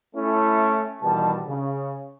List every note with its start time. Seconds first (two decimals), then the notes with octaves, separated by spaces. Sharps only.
0.15 A3 C#4 E4
1.01 B2 D#3 E3 G3 A5
1.46 C#3